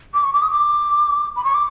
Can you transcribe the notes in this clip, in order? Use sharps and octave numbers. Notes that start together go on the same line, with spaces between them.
D6
C#6
D6
D#6
D6
B5
C#6
D6